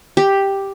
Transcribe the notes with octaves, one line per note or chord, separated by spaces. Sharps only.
G4